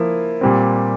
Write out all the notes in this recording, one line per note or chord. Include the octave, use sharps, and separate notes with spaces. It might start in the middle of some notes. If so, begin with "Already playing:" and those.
Already playing: F3 A#3 E4
A#2 G3 C4